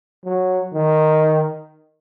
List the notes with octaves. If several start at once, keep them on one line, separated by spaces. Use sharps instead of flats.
F#3
D#3